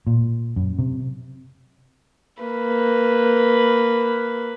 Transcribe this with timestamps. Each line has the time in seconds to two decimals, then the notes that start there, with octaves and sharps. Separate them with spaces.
0.07 A#2
0.56 F#2
0.79 C3
2.42 A#3 B4